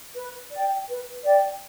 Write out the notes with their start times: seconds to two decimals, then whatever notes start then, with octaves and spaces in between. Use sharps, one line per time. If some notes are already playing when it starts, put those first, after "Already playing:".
0.16 B4
0.51 D5 G5
0.88 B4
1.23 D5 G5